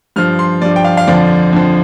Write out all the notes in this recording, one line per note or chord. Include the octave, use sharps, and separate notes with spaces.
G2 F3 F6
C6
G2 F3 D5
G5
F5
F5
F2 D3 F3 D5
F2 D3 F3